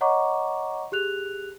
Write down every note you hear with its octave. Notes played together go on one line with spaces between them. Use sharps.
C#5 D#5 F#5 A#5 C#6 D6
G4 G#4 F#6 F7